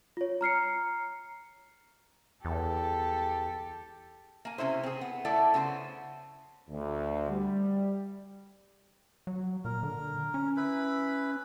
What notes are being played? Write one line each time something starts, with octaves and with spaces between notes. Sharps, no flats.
F4 C#5
A#5 F6 C7 C#7
E2 G4 A4
A#3 G#5
C3 C#4 E4 C5
C4 G#4
B3
A3 E4 A4 D5
C#3 B3 F4 C5
D2
G3
F#3
A#2 A#4
D3
C#4
E4 B4 B5